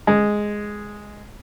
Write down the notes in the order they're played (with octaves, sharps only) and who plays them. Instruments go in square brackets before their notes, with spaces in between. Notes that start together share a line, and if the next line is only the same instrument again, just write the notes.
[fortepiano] G#3